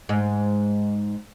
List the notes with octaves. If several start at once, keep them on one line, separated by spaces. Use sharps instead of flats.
G#2